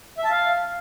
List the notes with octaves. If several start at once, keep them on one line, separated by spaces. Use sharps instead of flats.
E5
A5
F5